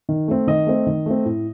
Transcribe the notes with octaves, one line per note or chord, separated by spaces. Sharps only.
D#3
A3 C4
D#3 D#5
A3 C4
D#3
A3 C4
A2